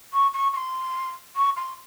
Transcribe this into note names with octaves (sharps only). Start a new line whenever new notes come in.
C#6
C#6
C#6
C6
C#6
C6